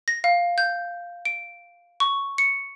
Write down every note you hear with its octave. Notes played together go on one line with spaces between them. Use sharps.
A#6
F5
G6
D7
C#6
C#7